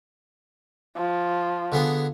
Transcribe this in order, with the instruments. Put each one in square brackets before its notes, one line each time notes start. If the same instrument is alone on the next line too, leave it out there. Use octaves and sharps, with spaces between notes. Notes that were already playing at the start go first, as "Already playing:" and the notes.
[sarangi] F3
[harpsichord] D3 B3 G#4